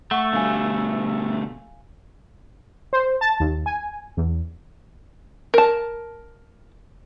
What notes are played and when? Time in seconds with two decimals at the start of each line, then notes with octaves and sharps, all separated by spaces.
0.11 A3 F#5 C#6
0.33 B2 D3 G3 F5 G#5
2.93 C5
3.21 A5
3.40 D#2
3.66 G#5
4.17 E2
5.54 A#4 A5